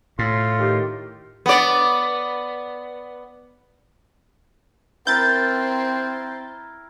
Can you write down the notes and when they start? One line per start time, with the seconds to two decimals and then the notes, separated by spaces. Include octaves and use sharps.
0.19 A2 F4
0.58 D#3 G4
1.46 B3 D5
5.07 C4 E4 A#4 G6 A6